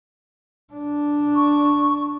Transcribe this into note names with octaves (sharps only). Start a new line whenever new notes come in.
D4
C#6